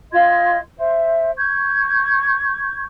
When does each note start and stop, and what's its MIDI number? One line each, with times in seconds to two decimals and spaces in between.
0.11 0.57 65
0.11 0.57 75
0.11 0.57 84
0.11 0.57 92
0.77 1.30 72
0.77 1.30 76
1.36 2.83 85
1.36 2.83 91
1.36 2.83 92